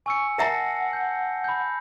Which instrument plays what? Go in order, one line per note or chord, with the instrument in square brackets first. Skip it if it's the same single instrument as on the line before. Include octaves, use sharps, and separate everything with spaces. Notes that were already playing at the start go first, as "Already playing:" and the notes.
[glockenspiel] G#5 E6 C#7 [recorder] C#6
[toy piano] A#4 E5 A#5 [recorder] F#5 [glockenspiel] A5 A#6 C7
[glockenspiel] G6
B5 G6